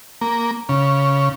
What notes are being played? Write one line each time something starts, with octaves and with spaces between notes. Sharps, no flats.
A#3
C#3